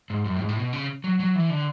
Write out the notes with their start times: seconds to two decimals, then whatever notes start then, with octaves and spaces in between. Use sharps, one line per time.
0.10 G#2
0.25 F#2
0.36 A2
0.41 G#2
0.49 A2
0.56 B2
0.73 C#3
1.04 F#3
1.20 F#3
1.35 E3
1.50 D3